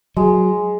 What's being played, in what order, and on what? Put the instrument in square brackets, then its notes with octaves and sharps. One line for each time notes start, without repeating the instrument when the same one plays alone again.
[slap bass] F#3 [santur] G#3